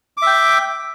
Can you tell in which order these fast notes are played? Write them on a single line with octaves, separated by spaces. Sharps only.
D6 E5 G5